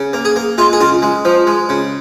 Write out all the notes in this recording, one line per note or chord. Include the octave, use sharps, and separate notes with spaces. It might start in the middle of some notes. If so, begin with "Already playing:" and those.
Already playing: C#3
A#3
G#4
A#3
G#3 F4
G#4
C#3 F4
G#3
F3
G#3
C#3